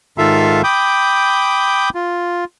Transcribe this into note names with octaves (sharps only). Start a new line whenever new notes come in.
G#2 D#3 F4 A4 E5 F5
G5 B5 D6 D#6 G6
F4